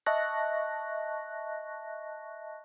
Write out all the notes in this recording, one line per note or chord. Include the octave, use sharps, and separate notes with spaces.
D#5 E5 A5 C#6 F#6 A#6